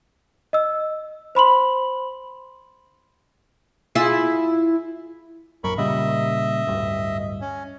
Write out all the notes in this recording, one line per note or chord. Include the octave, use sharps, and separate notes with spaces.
D#5 E6
C5 B5 C6 F#7
E4 F4 G#4
A#1 F#2 A#4 B5 C#6
A#2 C#3 G3 D#5 E5
D1 G2
C#4